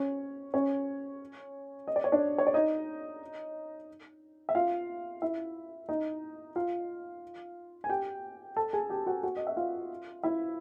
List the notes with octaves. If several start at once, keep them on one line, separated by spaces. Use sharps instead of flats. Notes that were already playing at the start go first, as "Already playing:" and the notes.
Already playing: C#4 C#5
C#4 C#5
D#5
D5
C#5
D4 D5
C#5
D5
D#4 D#5
E5
F4 F5
E4 E5
D#4 D#5
F4 F5
G#5
G4 G5
A4 A5
G#4 G#5
G4 G5
F#4 F#5
F#4 F#5
D#5
E5
F4 F5
E4 E5